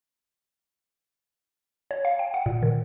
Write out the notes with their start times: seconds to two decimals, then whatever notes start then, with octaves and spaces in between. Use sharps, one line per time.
1.91 C#5
2.05 F5
2.19 G5
2.34 F#5
2.46 A#2
2.63 D#3